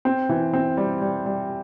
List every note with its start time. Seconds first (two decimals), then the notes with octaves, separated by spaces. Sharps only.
0.05 C4
0.29 E3
0.54 C4
0.77 G3
1.02 G3
1.26 G3